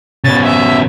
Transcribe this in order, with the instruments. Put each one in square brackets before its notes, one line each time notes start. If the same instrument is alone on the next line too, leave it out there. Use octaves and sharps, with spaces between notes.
[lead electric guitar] C#3 B3 [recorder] A6
[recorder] E5